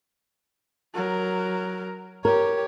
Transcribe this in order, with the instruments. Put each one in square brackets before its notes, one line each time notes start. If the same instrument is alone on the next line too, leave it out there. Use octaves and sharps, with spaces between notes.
[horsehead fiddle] F#3 A#4
[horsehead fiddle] G4 C#5 [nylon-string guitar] A#4